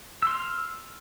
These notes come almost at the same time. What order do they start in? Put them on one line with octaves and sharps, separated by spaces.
E6 C6 F6